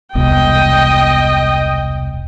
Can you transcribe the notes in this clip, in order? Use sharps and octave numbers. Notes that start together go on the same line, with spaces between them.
E1 C2 B2 D#5 G5